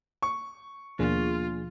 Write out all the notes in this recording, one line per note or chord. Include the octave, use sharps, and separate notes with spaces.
C#6
D#2 B2 F3 A#3 D4 F4 G#4